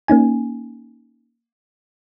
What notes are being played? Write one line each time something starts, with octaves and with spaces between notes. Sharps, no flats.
A#3 C#4 D#4 G#5